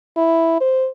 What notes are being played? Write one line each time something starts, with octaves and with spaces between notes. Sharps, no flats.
E4
C5